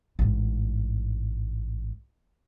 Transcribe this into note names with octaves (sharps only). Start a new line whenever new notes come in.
A1 G#2